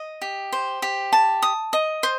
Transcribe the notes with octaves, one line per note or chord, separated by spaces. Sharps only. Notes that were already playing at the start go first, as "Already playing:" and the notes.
Already playing: D#5
G4
C5
G4
A5
D#6
D#5
C5